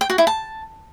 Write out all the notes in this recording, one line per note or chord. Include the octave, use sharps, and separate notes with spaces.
G5
F#4
E4
A5